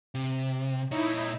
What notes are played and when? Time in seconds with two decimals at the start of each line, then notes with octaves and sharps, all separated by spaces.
0.15 C3
0.91 A#2 D#4 E4 C#5